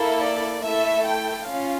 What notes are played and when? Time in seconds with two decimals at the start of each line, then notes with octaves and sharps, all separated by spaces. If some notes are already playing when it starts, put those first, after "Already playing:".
Already playing: A#3 E4 A4
0.20 D5
0.61 A3 E4 A4 E5
1.05 G5
1.46 C#4 F4 F5